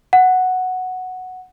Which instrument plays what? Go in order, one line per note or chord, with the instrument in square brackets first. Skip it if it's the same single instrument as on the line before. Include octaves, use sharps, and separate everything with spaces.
[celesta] F#5